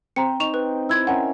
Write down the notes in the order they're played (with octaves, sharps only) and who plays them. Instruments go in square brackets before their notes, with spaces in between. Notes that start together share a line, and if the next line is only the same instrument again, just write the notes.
[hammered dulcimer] C4 C5 [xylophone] A#5 C#7
[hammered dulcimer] D#4 [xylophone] C#6 E7 F7
[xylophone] B4
[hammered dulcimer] E4 C5 E5 [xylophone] E6 G#6
[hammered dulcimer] C#4 A#4 [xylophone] F#5